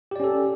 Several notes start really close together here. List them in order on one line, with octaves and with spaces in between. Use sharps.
G4 D5 C#4 A4